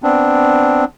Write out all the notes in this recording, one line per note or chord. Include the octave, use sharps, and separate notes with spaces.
B3 C4 D4